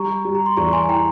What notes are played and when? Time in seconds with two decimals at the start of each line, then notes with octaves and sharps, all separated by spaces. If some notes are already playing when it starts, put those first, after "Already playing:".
Already playing: G3 A#5 C#6
0.25 G3
0.35 A#5
0.46 C6
0.57 E2 A#5 C#6
0.72 G#5 C6
0.83 G#5
0.88 E3 G5 A#5